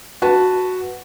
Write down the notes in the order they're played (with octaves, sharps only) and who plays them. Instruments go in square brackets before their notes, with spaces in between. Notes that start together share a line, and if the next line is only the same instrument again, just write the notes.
[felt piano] F#4 B4 A5